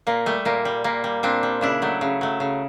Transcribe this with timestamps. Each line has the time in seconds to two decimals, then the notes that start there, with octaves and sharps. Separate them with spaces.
0.07 A#2 A#3
0.26 G3 A3
0.45 A#2 A#3
0.65 G3
0.84 A#2 A#3
1.04 G3
1.23 A#2 C4 D4
1.43 G3
1.61 C#3 D4 E4
1.82 F#3 A3
2.01 C#3
2.21 F#3 A3
2.40 C#3